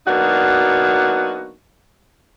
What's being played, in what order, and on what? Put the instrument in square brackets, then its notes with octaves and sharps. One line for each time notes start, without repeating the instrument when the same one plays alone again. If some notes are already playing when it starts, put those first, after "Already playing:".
[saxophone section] F#3 A#3 B3 D4 D#4 F#4